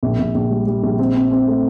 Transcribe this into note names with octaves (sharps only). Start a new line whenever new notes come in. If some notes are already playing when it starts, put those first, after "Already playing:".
A#1
A#1
A#1
G3
G3
A#1
C4
C4
C4
A3